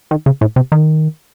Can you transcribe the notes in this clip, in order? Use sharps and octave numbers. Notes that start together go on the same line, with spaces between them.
D#3
C#3
A2
C3
D#3